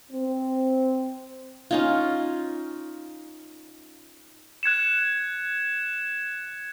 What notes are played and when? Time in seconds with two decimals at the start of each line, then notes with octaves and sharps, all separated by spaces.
0.12 C4
1.71 C#4 D#4 F4
4.63 F#6 G#6 C#7 E7